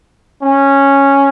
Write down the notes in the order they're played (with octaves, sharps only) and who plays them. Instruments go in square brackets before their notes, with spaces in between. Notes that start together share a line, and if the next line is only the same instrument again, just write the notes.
[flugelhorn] C#4